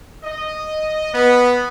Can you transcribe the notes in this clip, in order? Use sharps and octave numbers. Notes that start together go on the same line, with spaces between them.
D#5
B3